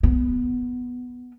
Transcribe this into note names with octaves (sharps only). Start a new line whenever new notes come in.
B3